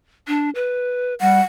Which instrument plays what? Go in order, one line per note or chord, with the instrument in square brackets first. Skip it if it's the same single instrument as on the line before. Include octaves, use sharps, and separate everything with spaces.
[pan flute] D4
B4
[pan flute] G3 [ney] F#5